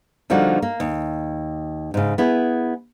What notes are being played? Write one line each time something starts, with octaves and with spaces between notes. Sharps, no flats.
D3 F3 G3 A#3 D#4 F#4
A#3
D#2
G#2 C#3
B3 E4 G#4